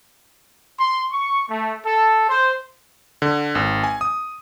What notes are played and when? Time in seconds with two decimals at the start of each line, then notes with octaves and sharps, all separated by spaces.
0.80 C6
1.12 C#6
1.50 A3
1.85 A4
2.29 C5
3.22 D3
3.55 G#1
3.84 G#5
4.01 D#6